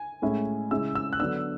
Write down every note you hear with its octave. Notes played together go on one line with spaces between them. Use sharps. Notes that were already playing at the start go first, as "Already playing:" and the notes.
Already playing: G#5
A2 G#3 C#4 E4
C#3 G#3 C#4 E4 E6
E6
F#6
D3 F#3 B3 D4 E6